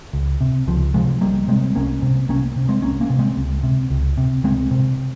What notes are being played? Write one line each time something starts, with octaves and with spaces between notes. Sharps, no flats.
C#2
C3
C#2 F3
C3 F3 G#3
C2 G3 A#3
C3 G#3 C4
C2 A#3 C#4
C3
C2 A#3 C#4
C3
G#3 C4
C2 A#3 C#4
A#3 C#4
C3
G#3 C4
C#2
C3
C#2
C3
C#2 G#3 C4
C3